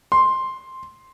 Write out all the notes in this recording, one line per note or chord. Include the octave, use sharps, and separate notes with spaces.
C6